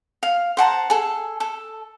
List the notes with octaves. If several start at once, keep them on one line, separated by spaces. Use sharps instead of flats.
F5
C5 F#5 A5 A#5
G#4 A4
A4